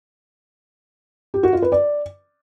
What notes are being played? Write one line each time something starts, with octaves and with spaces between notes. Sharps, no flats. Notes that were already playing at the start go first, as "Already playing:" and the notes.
G4
F#4
F4
B4
D5